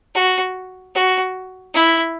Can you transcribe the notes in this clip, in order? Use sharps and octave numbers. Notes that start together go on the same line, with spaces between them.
F#4
F#4
E4